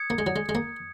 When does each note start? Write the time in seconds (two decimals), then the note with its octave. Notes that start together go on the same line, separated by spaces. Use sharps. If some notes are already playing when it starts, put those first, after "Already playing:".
Already playing: D#6 G#6 C#7
0.10 A#3
0.18 G#3
0.27 F#3
0.36 G#3
0.49 G#3
0.55 A#3